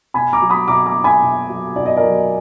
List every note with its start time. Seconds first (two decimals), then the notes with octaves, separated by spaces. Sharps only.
0.14 B2 G#5 B5
0.33 A#5 D6
0.42 F#3
0.50 B5 D#6
0.68 B2 A#5 D6
0.86 A#5 D6
0.96 F#3
1.04 G#5 B5
1.22 B2
1.49 F#3
1.76 B2 D5
1.86 D#5
1.97 A#4 D5
2.03 F#3